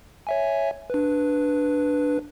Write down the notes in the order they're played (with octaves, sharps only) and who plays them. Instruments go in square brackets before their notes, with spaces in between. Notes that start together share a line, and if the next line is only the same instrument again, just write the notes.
[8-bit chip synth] C#5 E5 G#5
D4 B4